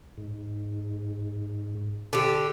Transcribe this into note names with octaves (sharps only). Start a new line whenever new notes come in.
G#2
D3 G4